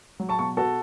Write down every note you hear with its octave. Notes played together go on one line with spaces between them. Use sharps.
F#3
A5 C#6
B2 A5 C#6
F#4 A4